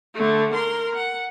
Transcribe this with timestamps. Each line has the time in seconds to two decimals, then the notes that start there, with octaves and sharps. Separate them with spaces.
0.15 D3 A3
0.54 A#4 C6
0.95 F#5